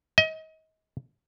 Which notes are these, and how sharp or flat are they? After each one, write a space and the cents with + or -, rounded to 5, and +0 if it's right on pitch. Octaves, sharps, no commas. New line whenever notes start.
D#5 +30